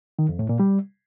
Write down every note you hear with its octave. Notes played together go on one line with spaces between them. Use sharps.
D#3
F2
A2
A#2
G3